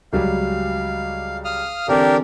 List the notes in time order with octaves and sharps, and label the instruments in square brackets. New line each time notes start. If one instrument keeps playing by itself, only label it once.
[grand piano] C#2 F#3 G3 [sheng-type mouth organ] F5
[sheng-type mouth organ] F5 D#6 F6
[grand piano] D3 E3 C4 [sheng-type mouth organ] D4 G4 A#4